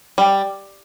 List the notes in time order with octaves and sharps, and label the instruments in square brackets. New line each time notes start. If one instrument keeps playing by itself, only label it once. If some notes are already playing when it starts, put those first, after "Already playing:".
[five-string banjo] G3